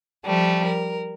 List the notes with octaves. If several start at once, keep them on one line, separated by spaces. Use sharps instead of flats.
F3 G3 A3
A#4